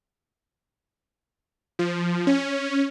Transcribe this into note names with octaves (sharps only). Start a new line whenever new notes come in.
F3
C#4